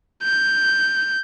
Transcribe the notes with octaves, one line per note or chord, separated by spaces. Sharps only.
G6